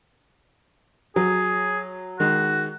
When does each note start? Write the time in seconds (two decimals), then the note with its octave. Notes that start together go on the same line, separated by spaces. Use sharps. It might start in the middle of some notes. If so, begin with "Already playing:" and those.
1.16 F#3 G#4
2.20 D#3 G#3 F#4